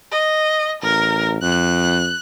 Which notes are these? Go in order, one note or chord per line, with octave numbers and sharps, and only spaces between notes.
D#5
A1 A#4
F2 F#6